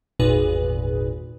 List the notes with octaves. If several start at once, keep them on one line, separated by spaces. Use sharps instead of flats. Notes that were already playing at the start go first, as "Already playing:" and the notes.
G#1 E2 A#2 G#4 B4